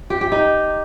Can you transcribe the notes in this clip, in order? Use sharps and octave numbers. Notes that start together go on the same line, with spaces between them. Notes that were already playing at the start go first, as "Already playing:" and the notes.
G4
G4
D#4